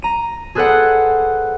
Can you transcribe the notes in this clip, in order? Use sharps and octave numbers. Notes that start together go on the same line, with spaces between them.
A#5 D#7
G#4 A4 B4 C5 D5 F#5